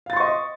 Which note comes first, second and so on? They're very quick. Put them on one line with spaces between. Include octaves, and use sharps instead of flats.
F5 A6 C6 C#6 D#5